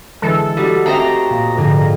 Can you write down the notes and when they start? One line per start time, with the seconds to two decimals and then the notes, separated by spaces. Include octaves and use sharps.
0.22 D3 E3 G#3 A4
0.57 G3 A3 F#4 D#5
0.86 A3 C4 G4 A#5 D#6 E6 A#6 C7
1.31 A#2
1.57 F2 G#2 D3